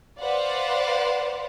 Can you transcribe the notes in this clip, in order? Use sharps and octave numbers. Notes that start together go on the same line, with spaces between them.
B4 C5 D5 F5 F#5